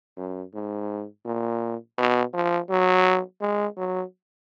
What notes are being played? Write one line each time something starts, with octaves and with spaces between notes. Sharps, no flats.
F#2
G#2
A#2
B2
F3
F#3
G#3
F#3